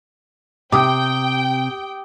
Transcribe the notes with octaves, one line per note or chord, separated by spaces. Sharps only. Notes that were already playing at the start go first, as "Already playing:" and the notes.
C3 G5 D6 D#6